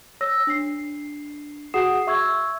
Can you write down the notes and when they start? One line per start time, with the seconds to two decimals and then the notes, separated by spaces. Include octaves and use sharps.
0.21 C#5 E6 A#6
0.47 D4 C7
1.74 F#4 G#4 F#5 D#6 C7 E7
2.07 E5 C#6 E6 G#6